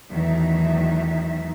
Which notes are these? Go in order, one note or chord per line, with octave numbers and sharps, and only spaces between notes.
E2 D#3 F#3 A3 D#4 E5